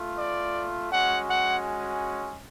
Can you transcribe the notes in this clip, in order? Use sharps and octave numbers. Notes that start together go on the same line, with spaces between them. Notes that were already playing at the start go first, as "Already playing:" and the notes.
Already playing: A3 F4
D5
G#3 C#4 F#4 F#5
F#5